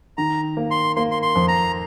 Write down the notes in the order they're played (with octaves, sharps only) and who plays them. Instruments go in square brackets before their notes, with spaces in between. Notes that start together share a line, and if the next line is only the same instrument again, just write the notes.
[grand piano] D#3 [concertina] A#5
[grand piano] A#3
[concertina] C6
[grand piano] A#3 [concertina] C6
[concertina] C6
C6
[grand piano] F2
[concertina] A#5